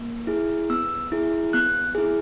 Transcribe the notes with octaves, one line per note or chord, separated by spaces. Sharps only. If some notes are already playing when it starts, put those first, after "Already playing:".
Already playing: A#3
E4 G#4
B3 E6
E4 G#4
B3 F#6
E4 G#4